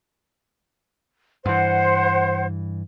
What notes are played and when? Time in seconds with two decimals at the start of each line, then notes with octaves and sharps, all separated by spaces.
1.46 G2 E3 C5 F#5